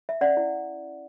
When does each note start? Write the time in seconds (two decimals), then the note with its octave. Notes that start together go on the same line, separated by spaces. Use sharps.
0.09 E5
0.21 C#4 D5 F#5
0.37 E4